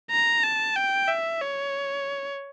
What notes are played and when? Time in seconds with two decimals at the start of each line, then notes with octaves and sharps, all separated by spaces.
0.11 A#5
0.44 A5
0.76 G5
1.08 E5
1.41 C#5